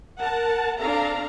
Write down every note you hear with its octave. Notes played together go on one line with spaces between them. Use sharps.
A#4 F#5 A5
C4 D4 A4 F5 A#5